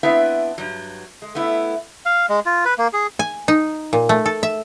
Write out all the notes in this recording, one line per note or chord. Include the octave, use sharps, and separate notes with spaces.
B3 C4 D4 E4 B4 E5
G2 F#3
G#3
A3 B3 E4
F5
G#3
F4
B4
A#3
G#4
G#5
D#4
A#2
A3
A4
E5